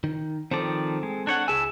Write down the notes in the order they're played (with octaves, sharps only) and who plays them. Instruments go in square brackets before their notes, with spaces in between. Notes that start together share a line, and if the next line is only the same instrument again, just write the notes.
[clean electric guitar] D#3
[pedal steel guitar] D#3 F3 D5 [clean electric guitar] C4 A4
[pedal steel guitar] G#3
D4 C#5 F#5
[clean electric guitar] C#2 G#4 G#5 [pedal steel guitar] E4 A5 E6